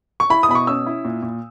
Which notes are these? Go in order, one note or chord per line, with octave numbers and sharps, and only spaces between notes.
C#6
E4 B5
D#6
B2 B5
C#6
C#4 E6
E4
A#2
A#2